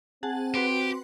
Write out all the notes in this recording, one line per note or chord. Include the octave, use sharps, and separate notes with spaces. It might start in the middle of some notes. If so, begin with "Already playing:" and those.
C4 G#4 F#5 A5
F#4 G4 B4 C6